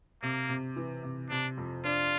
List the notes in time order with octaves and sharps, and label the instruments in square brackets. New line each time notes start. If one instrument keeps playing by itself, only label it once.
[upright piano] C3 [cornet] A#3
[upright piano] C3
E3
C3
[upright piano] C3 [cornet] D4
[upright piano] F2
[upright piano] D4 [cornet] F4